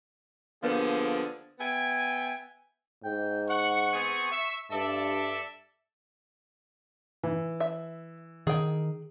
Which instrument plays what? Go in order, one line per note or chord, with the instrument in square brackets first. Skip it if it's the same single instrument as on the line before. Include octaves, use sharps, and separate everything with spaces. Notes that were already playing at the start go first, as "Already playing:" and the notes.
[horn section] D3 F3 A#3 B3 G4 G#4
B3 E5 G5 G#5
[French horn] G#2 [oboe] G5
[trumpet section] F#5 [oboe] C#6
[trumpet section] B3 C4 G#4
E5
[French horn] G2 [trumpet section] A4 D5 E5 [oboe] A5
[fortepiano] E3
[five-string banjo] E5
[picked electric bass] D#3 [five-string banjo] G#4 G5